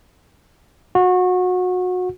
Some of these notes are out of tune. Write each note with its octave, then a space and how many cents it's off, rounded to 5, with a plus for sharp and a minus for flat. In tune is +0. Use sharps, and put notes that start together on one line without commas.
F#4 -25